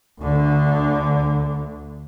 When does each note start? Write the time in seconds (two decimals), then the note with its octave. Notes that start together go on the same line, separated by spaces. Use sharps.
0.20 D2 D3